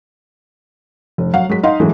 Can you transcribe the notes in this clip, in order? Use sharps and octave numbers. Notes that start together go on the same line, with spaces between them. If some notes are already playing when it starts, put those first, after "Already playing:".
F1
F#3 F5 F#5
F#3 G#3 B6
D#4 D#5 F5 F#5 C6
E3 F#3 G#3 A3